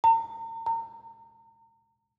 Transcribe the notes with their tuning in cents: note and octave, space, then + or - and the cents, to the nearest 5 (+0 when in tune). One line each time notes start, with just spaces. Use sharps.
A#5 -40
A#5 -35